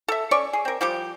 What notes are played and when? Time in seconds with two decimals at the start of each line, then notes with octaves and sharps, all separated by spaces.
0.08 A4 E5
0.31 C#4 C#5 D5 C#6
0.53 G#4
0.65 C4 A#4
0.81 F3 G3 G4